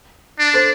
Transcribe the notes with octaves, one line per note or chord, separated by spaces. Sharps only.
D4
A4 C5